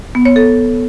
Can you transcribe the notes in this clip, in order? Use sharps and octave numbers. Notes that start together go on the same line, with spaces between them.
B3
C#5
A4